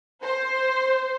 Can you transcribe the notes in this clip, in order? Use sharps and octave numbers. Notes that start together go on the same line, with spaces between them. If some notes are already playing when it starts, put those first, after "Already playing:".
C5